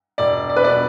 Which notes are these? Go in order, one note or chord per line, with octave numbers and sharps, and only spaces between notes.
E1 D5
D5
B4
B2 B3 D5